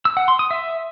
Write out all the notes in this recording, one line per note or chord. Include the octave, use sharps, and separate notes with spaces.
E6
F#5
C6
D#6
E5